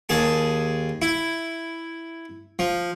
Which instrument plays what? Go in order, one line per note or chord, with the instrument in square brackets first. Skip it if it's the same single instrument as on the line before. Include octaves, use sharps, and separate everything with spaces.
[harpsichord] D#2 G#4 A5
E4
F3